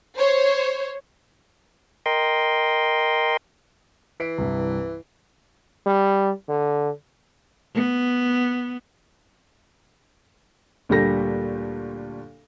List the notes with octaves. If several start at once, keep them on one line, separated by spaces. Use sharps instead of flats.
C5 C#5
A#4 D#5 G5 C6
E3 B6 C7 D7
C2 G2
G3
D3
B3
D2 A#2 G3 G4 A4 A#6